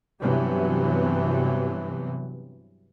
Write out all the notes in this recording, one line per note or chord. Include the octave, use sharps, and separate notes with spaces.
G2 C3 E3 F#3 B3